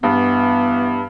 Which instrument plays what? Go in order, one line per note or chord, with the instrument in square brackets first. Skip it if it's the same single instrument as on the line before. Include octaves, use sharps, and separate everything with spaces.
[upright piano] G2 [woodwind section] E3 B3